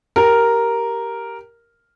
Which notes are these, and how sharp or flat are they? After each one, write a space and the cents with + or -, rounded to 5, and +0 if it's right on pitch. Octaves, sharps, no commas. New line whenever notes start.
G4 +0 A#4 +0